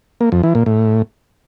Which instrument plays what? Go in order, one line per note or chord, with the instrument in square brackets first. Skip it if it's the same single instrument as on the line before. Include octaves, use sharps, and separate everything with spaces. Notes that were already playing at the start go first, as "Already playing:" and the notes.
[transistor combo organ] A#3
F2
E3
A#2
A2